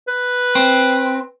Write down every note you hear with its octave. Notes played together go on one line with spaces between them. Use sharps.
B4
C4